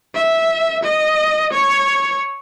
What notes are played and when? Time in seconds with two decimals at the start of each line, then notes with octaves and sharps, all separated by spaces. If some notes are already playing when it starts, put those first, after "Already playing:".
0.15 E5
0.83 D#5
1.53 C#5